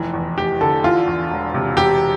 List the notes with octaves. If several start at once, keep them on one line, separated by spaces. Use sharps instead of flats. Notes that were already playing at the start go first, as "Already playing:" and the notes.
Already playing: F1 E3
E2
F1 G4
D3 A4
E3 F4
E2
E1
C3
E1 G4